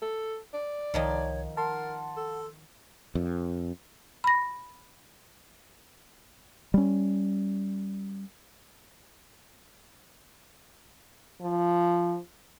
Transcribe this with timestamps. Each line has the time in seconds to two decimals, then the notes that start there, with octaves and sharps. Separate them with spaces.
0.02 A4
0.54 D5
0.94 C2 D#3 F3 D#4 C#5
1.57 A#4 F#5 A5 C6
2.17 A4
3.15 F2
4.24 B5 A#6
6.74 G3 C#4
11.41 F3